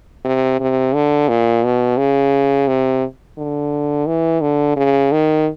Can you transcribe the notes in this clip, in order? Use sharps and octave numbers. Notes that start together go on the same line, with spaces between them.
C3
C3
D3
A#2
B2
C#3
C3
D3
E3
D3
C#3
D#3